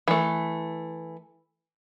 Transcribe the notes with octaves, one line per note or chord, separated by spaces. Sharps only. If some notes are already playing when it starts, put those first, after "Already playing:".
E3 A3